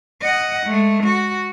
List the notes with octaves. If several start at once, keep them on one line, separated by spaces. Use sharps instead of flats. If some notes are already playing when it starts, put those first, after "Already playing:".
D#5 F#5
G#3 A3
F#4